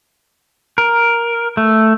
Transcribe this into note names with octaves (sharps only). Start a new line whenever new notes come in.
A#4
A3